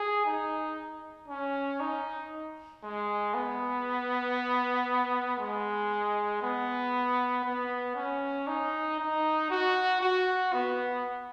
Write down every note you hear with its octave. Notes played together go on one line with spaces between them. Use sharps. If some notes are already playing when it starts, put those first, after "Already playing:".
Already playing: G#4
D#4
C#4
D#4
G#3
B3
G#3
B3
B3
C#4
D#4
D#4
F#4
F#4
B3